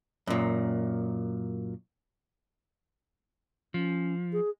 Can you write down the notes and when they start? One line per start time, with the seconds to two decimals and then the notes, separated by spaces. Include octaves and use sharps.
0.27 F#2 A#2
3.74 F3 C#4
4.33 G#4